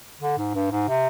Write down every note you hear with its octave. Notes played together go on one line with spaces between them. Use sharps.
D3
G#2
G2
G#2
C3